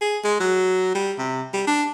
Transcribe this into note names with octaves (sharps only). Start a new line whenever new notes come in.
G#4
G#3
F#3
G3
C3
G3
D4